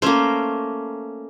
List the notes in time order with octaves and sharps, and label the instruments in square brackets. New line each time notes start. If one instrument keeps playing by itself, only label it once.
[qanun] A3 A#3 [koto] C#4 C5